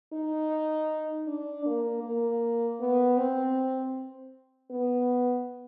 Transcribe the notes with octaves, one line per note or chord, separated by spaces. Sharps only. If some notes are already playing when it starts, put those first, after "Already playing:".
D#4
D4
A#3
A#3
B3
C4
B3